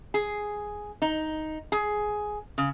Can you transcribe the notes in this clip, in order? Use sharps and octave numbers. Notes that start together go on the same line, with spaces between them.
G#4
D#4
G#4
C#3